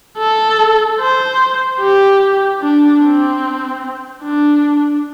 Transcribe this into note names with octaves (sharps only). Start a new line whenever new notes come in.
A4
C5
G4
D4
C4
D4